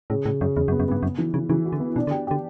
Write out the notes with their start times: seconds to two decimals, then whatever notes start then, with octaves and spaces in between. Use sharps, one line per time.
0.10 A2 C#3
0.25 A2 C#3
0.41 F#2 C#3
0.56 E2 C#3
0.68 F#2
0.72 B3
0.80 F#2
0.88 G2 B3
1.03 F#2 B3
1.18 E3
1.34 C#3 E3
1.49 C#3 E3
1.66 F#4
1.73 D3
1.80 B3
1.96 B2 D4
2.07 D3
2.11 G4
2.27 D3 G4